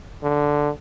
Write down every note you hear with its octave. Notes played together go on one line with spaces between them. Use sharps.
D3